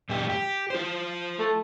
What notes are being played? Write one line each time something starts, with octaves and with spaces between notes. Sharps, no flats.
F#2 A#2 G4
G4
F4 C5
A3